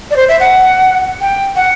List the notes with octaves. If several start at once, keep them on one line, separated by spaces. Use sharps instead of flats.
D5
C5
E5
F#5
G5
F#5